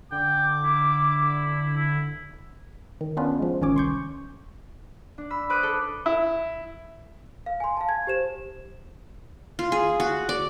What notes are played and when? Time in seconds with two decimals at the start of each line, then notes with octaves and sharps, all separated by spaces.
0.12 D3 G5 D6
0.63 E4
1.77 E4
3.01 D#3
3.17 B3 C#4 D4 F4 B4
3.39 F3 G#3
3.61 G#1 D#3 C#4 C#5 D6
3.75 C2 C6 C#6 G6
5.18 D4
5.30 B5 E6
5.50 B4 C5 D6 D#6 F#6
5.63 A4
6.06 E4
7.46 F5
7.60 G#5 C6
7.77 F5 A5
7.89 G#6
8.07 G4 C5 E7
9.59 F4
9.72 G#4
10.00 F#4
10.29 D5